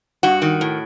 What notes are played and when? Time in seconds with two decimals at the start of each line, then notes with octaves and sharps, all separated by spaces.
0.23 G2 F#4
0.42 D#3
0.61 A2